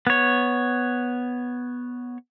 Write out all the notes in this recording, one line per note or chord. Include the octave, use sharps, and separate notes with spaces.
B3 C#5